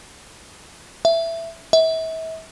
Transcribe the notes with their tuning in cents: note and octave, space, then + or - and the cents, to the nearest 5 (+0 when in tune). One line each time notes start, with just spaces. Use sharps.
E5 +10
E5 -35